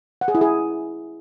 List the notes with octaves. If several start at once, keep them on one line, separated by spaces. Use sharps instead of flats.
F#5
G#4
E4
G#4